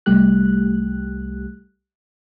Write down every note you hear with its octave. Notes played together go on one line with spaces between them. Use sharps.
C2 G3 A3 G4 F#6